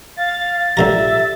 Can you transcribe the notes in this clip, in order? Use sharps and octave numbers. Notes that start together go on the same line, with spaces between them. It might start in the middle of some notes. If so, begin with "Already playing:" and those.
F5 A6
C#2 D3 G4 D5 E5 A#5